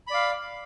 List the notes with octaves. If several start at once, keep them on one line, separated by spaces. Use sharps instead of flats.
D5 F5 B5